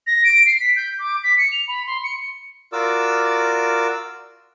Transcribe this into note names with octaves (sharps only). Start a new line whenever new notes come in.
A#6
D7
C7
B6
G6
D6
B6
C#7
F7
B5
C6
C#7
F4 F#4 A#4 D5 D6 E6